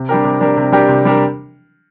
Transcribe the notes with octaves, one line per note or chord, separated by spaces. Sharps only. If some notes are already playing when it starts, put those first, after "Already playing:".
Already playing: C3
G3 D4 G4 A#4
C3
G3 D4 G4 A#4
C3
G3 D4 G4 A#4
C3
G3 D4 G4 A#4